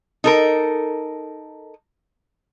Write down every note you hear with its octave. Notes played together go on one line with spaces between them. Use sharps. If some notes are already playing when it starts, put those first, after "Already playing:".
D#4 A4 A#4